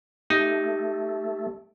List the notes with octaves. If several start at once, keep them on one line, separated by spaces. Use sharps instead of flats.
A3 D#4 G4